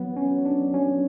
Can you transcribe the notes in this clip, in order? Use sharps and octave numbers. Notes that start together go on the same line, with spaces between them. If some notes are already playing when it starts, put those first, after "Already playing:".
Already playing: F#3 B3
C#4
F#3
D4
F#3 C#4